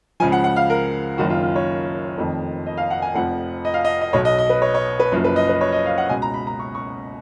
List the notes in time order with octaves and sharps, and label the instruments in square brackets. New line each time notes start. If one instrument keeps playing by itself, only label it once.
[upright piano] C#2 C#3 F3 G#5
F#5
F#5
F5
A#4
F#1 F#2 D#3 F#4
F4
F4
C#5
F1 F2 D#3
D#5
F5
F#5
G#5
F1 F2 F3 F#5
D#5
F5
D#5
D#5
B1 B2 C#5
D#5
D#5
B4
C#5
C#5
B4
F#1 F#2 F3
B4
D#5
B4
C#5
D#5
F5
F#5
C#2 B2 G#5
A#5
B5
A#5
C#6
C#6